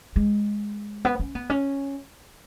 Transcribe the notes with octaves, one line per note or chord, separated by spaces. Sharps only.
G#3
B3
C#4
B3
C#4